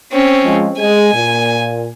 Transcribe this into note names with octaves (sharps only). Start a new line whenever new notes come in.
C4 C#4
F3 G#3
G#3 G#5
A#2